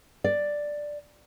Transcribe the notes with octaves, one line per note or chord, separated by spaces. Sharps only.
D5